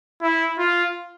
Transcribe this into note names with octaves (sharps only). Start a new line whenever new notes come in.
E4
F4